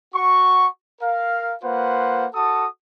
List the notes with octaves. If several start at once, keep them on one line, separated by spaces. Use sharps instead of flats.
F#4 C#6
A#4 F5
A#3 F4 B4 C5 F#5
F#4 A4 A5 D#6